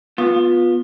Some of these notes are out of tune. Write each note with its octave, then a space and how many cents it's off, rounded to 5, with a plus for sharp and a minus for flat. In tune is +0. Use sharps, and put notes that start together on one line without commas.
B3 -10 F4 +20